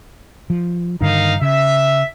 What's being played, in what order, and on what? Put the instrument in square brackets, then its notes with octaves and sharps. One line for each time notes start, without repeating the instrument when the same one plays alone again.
[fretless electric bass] F3
[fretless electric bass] G2 D3 D#3 [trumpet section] D#4 A#4 F5
[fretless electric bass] C#3 [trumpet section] E5